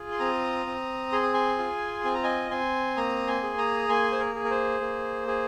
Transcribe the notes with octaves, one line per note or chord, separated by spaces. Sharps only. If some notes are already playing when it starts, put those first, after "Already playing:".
Already playing: F4 G#4
C6
C4 A#5 D#6
C4
G#4 C6
D#6
G#5 C6
F4
C4 G#5
A#5
D#5 G#5
C4 G#5 C6
A#3 A#5 D#6
G#5 C6
G#4
A#5 D#6
A#3 G#5 C6
C5
A#4
G#4
A#4
C5
A#3
G#4